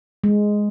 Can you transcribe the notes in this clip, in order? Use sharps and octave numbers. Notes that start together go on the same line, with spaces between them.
G#3